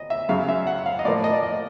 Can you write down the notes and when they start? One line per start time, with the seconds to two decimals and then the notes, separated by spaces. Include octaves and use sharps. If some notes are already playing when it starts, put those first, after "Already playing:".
Already playing: D#5
0.10 E5
0.29 F#2 C#3 F#3 F5
0.48 E5
0.67 F#5
0.86 F5
0.99 D#5
1.05 A2 F3 A#3 D5
1.24 D#5
1.33 D5
1.43 D#5